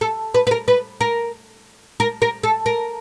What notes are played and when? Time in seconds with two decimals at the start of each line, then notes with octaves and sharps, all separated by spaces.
0.01 A4
0.34 B4
0.47 B4
0.51 A#4
0.68 B4
1.01 A#4
2.00 A#4
2.22 A#4
2.43 A4
2.66 A#4